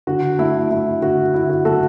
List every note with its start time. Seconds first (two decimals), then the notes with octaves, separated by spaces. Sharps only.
0.07 D3 F#4
0.39 A3 E4
0.70 A3 E4
1.02 D3 F#4
1.34 D3 E4
1.49 F#4
1.65 A3 F#4 A4